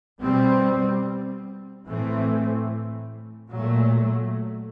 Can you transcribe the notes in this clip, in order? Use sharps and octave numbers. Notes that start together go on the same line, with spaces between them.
B2 G3 C4
A2 E3 A3 C4
A#2 F#3 A3